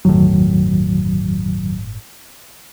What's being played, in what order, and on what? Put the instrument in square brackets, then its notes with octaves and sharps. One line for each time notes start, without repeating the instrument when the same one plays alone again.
[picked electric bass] G1 A2 [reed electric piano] E2 D#3 F#3